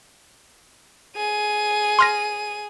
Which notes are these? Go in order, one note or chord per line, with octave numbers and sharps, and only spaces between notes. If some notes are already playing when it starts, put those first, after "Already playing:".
G#4 D#7
C6 F6 A#6